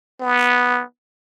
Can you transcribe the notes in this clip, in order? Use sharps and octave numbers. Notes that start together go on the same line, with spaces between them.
B3